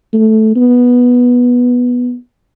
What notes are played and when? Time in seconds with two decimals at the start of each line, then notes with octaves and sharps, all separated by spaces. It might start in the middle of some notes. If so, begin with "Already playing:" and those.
0.13 A3
0.56 B3